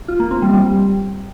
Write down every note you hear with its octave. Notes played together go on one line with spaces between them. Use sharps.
F4
A#3
C4
G3
G3